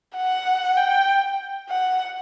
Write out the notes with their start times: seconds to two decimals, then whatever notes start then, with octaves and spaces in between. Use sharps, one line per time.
0.16 F#5
0.77 G5
1.70 F#5